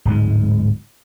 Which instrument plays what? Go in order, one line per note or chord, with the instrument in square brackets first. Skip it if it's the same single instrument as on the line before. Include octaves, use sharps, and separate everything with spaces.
[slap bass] D1 G#2 G#3